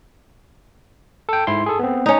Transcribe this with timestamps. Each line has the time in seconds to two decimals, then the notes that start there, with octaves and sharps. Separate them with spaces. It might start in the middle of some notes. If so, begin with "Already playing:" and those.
1.29 A4 G5
1.47 G#2 E4 C6
1.66 G#4 A4
1.79 B3 C4
2.06 C#4 D#4